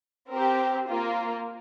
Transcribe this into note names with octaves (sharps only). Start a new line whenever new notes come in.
C4 G4 A#4
A#3 F4